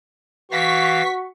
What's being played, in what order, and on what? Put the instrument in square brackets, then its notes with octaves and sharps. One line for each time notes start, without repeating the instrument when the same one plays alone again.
[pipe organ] E3 F5 A#6 [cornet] F#4 [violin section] C#6 B6